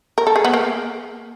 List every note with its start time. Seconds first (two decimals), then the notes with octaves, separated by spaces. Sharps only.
0.18 A#4
0.27 A4
0.36 G#4
0.45 B3
0.54 A#3